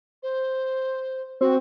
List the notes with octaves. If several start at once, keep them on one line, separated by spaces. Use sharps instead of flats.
C5
C4 F#4